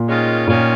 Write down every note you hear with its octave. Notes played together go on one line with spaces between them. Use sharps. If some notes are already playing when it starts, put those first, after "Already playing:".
Already playing: A#2
D#3 G#3 C#4 F4
A#2 D#3 C#4 F4